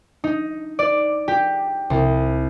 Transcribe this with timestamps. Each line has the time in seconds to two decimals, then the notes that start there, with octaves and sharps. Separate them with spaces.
0.24 D#4
0.79 D5
1.28 G4
1.90 C2